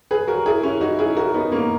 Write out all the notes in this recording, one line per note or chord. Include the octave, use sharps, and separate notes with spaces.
G#4 B4
F#4 A#4
E4 G#4
C#4 E4
D#4 F#4
E4 G#4
F#4 A#4
B3 D#4
A#3 C#4